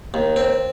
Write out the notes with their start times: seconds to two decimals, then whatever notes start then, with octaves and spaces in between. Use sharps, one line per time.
0.14 D#2
0.36 C4